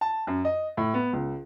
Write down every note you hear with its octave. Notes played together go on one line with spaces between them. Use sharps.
A5
F#2
D#5
A2
B3
C#2